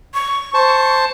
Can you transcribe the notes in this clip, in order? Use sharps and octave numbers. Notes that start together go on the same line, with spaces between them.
C#6
C5 A5